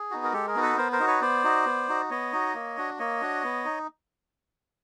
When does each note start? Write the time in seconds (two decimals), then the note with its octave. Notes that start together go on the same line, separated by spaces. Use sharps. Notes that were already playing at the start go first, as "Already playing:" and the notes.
Already playing: G#4
0.11 B3 D#4 F#4
0.24 A#4
0.33 G#3 G4 A4
0.47 G#4 A#4
0.55 B3 D#4 F#4
0.62 A4 B4
0.77 B3 A#4 C5
0.92 A#4 C5
1.00 D#4 F#4
1.07 B4 C#5
1.21 B3 C5 D5
1.44 D#4 F#4
1.66 B3
1.88 D#4 F#4
2.10 B3 C#5 D#5
2.33 D#4 F#4
2.55 A#3
2.77 D4 F#4
2.99 A#3 C#5 D#5
3.21 D4 F#4
3.43 B3
3.65 D#4